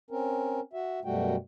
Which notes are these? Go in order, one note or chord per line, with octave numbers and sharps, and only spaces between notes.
C4 C#4 A#4
F#4 E5
F#2 B2 G3 A3 F#4 G5